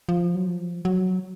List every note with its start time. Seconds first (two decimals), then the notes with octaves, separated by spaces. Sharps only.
0.09 F3
0.35 F#3
0.47 F3
0.85 F#3